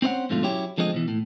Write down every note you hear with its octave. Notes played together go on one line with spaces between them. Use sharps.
C4 C#4 C5 D#5 F#5
F2 G#2 B2 D3 A3 F4
F#3 C#4 E4 G4
D3 F3 G#3 C4 C#5 D#5
B2 E3
A2